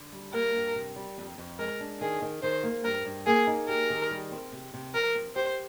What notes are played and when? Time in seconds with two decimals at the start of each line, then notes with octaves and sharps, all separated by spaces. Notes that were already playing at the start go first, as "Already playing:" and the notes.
Already playing: D3
0.12 G3
0.34 A#3 A#4
0.55 G2
0.75 C3
0.96 G3
1.18 F2
1.38 F2
1.59 G#3 A#4
1.81 D4
2.01 D#3 G#4
2.22 D#3
2.43 D#3 C5
2.63 A#3
2.84 G2 A#4
3.06 G2
3.27 A#3 G#4
3.47 D#4
3.68 G4 A#4
3.90 D#3
4.11 G3
4.32 C4
4.52 C3
4.74 C3
4.94 F3 A#4
5.15 C4
5.36 G4 C5